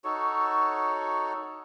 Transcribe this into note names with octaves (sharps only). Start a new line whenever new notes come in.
D#4 F#4 A4 C#5